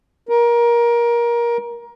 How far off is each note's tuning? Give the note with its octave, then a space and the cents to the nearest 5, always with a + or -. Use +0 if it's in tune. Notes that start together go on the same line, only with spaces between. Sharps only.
A#4 +20